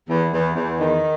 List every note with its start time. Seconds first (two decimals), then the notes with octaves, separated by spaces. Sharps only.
0.09 E2
0.33 E2
0.55 E2
0.79 D#3